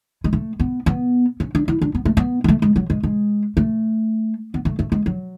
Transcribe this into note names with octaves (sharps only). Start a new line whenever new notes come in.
G#3
A3
B3
B3
C#4
D4
E4
D4
B3
A3
B3
G#3
A3
G#3
F#3
G#3
G#3
A3
B3
A3
A3
G#3
F#3